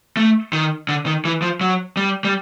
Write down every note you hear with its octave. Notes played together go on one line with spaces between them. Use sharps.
A3
D#3
D3
D#3
E3
F3
F#3
G3
G3